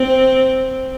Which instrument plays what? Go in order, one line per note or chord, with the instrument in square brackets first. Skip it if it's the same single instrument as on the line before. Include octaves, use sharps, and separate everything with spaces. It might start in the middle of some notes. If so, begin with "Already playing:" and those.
Already playing: [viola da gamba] C4